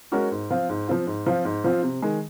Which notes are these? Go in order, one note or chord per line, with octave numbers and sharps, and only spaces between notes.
G#3 C#4 F#4 A#4
G#2
F3 C4 F4
G#2
F3 C4 F4
G#2
F3 C4 F4
G#2
F3 C4 F4
C3
D#3 G#3